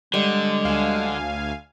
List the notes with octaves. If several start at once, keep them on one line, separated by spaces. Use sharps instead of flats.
D3 G3 G#3
D2 F5 G#5